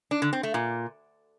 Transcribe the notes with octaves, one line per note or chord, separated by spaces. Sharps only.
D4
D3
C4
A3
A#2